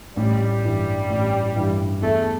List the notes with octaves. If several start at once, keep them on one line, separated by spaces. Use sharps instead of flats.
A1 G3
G2 E3
A1
G2 E3
E2 A3